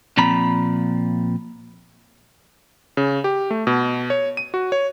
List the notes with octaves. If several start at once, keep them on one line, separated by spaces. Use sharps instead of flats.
A#2 F3 C4 A#5 B5
C#3
G4
A3
B2
C#5
D#7
F#4
C#5